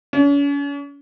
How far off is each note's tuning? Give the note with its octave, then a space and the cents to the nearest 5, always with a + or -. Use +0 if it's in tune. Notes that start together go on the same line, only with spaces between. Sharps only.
C#4 +40